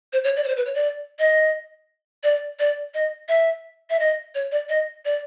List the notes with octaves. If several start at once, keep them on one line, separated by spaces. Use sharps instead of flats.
C5
C#5
D5
C#5
C5
B4
C#5
D5
D#5
D5
D5
D#5
E5
E5
D#5
C#5
D5
D#5
D5